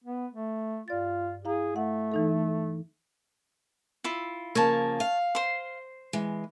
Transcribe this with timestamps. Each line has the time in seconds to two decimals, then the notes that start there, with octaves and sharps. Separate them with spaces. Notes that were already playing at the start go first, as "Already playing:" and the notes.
0.04 B3
0.33 A3
0.88 G2 F4 D5 A6
1.45 E4 G#4 F5 A#5
1.76 A3 F#5
2.12 E3 D#4 A4
4.04 E4 F4
4.55 C#3 F3 A#3 C#5 A5
5.00 F5
5.35 C5 C6
6.13 E3 G#3